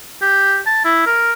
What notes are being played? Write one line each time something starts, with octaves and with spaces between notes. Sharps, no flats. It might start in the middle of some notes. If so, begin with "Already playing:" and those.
G4
A5
E4
A#4